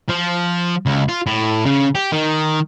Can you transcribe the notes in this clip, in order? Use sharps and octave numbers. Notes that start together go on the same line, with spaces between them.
F3
C#2
F4
A2
C#3
G4
D#3